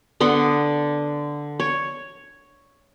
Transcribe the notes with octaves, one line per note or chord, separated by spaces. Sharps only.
D3 B3 C6
C#5